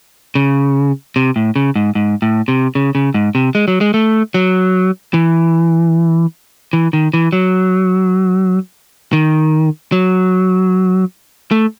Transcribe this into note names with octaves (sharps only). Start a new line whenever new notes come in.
C#3
C3
A2
C#3
G#2
G#2
A2
C3
C#3
C#3
G#2
C3
G#3
F#3
G#3
A3
F#3
E3
E3
D#3
E3
F#3
D#3
F#3
A3